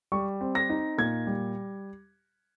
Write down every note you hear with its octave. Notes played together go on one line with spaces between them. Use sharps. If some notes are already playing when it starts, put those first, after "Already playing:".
G3 C#6
C4
A#6
D#4
A#2 G#6
G3